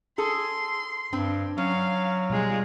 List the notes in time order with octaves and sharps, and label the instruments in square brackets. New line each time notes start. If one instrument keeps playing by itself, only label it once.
[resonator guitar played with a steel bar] G#4 A4 [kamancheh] C6
[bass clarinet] G2 [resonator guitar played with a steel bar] C4 [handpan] D4
[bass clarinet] F#3 [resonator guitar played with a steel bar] C#4 [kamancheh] F5
[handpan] B2 G3 [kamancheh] G#3 F4